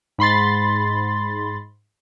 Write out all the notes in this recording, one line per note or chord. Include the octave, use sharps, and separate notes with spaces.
G#2 B5 C6 A6